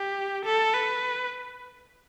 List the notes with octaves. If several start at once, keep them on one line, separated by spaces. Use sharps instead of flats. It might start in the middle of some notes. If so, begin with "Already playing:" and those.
Already playing: G4
A4
B4